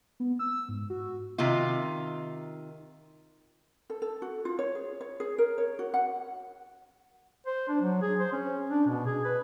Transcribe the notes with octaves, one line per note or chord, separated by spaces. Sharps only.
B3
E6
G#2
F#4
C3 D#3 D#4 F4
A4
A4
F#4
F4
C#5
G#4
C#5
G#4
A#4
C#5
F#4
F#5
C5
D4
F#3
G#4
C5
C#4
D4
B2
G#4
B4